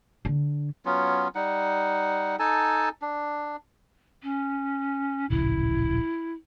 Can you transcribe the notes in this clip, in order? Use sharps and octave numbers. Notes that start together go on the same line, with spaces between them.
D3
F#3 B3 C#4 F4
G3 D#4 F#5
D#4 A4 G#5 A5
D4
C#4
D1 A#1 C#3 E4